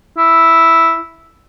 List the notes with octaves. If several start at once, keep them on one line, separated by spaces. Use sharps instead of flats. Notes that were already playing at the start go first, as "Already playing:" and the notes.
E4